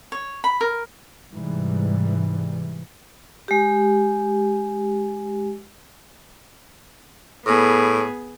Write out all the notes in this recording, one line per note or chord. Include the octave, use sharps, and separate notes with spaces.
C#5
B5
A#4
G#2 C3 E3 G3
G#3 G4
A2 B3 G#4